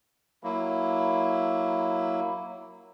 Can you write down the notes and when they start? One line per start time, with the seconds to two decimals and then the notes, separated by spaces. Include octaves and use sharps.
0.44 F#3 A#3 E4